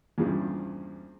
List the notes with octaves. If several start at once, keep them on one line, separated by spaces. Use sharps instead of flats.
E2 G2 A#2 C#3 F3